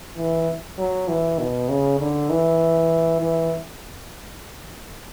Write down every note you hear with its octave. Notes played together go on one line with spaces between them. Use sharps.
E3
F#3
E3
B2
C#3
D3
E3
E3